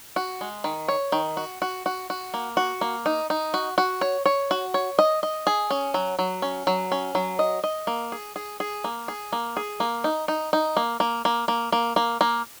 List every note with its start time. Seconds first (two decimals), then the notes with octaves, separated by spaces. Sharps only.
0.16 F#4
0.41 G#3
0.64 D#3
0.88 C#5
1.12 D#3
1.37 F#4
1.62 F#4
1.86 F#4
2.10 F#4
2.34 A#3
2.57 F#4
2.81 A#3
3.06 D#4
3.30 D#4
3.54 F#4
3.78 F#4
4.01 C#5
4.26 C#5
4.51 F#4
4.74 C#5
4.99 D#5
5.23 D#5
5.47 G#4
5.70 C#4
5.94 F#3
6.19 F#3
6.42 C#4
6.67 F#3
6.92 C#4
7.15 F#3
7.39 D#5
7.64 D#5
7.87 A#3
8.12 G#4
8.36 G#4
8.60 G#4
8.84 A#3
9.08 G#4
9.33 A#3
9.57 G#4
9.80 A#3
10.04 D#4
10.28 D#4
10.53 D#4
10.77 A#3
11.00 A#3
11.25 A#3
11.48 A#3
11.72 A#3
11.96 A#3
12.21 A#3